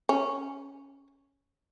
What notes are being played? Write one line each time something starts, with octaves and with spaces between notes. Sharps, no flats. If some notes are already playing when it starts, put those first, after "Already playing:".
C#4